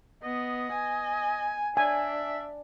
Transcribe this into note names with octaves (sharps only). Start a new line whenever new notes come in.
B3 D#5
G#5
D4 E5 G#5